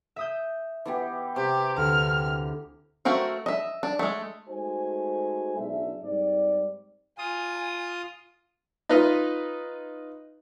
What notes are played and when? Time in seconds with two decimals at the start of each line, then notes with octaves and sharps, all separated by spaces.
0.16 E5 D#6 G6
0.85 E3 B3 G4
1.36 C3 G4
1.77 D2 F6
3.05 A3 C4 F#4 A#4 F5
3.46 D#5 E5
3.83 D4
3.99 G#3 A3
4.48 G#3 A3 D#4 F#4 C5 G#5
5.57 B1 C#3 D4 E4 G#4 E5
6.02 G#2 G3 C4 D5
7.18 F4 G#5 D#6
8.89 D#4 F4 B4 D#5